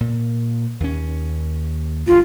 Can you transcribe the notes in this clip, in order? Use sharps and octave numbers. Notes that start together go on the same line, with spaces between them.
A#2
D#2 C#4
G1 E2 G2 F4